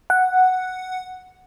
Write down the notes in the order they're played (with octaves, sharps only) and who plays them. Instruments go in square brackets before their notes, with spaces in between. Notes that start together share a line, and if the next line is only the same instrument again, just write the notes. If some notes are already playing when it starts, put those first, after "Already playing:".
[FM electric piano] F#5